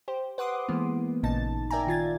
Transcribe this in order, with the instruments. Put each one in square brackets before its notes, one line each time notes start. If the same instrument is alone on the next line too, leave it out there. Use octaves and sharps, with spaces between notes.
[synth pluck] G4 C5
B4 F#5 C6 D6 D#6
E3 G#3 A#3 B3
A1 A#2 C#3 D#4 A5 A6
A#4 D5 E5 G5 G#5 A#5
D#3 F4 G#6 A6